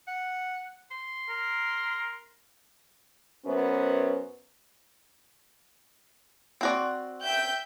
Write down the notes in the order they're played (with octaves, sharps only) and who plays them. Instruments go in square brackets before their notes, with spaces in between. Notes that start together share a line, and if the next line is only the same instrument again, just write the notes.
[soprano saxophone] F#5
C6
[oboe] A#4
[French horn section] F#2 B3 C#4 B4 C5
[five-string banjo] C4 F#4 D5
[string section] E5 G5 G6